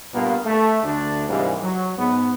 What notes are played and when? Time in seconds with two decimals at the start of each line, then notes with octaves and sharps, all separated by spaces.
0.14 G2 A#2 A#3 B3 A#4
0.46 A3
0.83 D2 D4
1.29 G#2 C3 E3 G3 A#3
1.62 F#3
1.98 G#2 B3